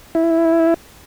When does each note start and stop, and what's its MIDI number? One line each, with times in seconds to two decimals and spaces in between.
0.15 0.74 64